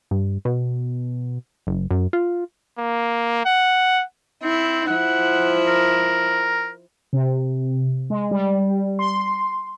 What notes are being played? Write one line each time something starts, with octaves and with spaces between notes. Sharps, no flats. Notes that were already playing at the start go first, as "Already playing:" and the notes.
G2
B2
F#1
F#2
F4
A#3
F#5
C4 E4
F3 E4 F#5
A#4
C3
G#3
G3
C6